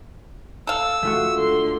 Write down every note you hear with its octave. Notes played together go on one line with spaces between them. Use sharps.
A4 F5 E6
A3 F4 F#4
D3 C6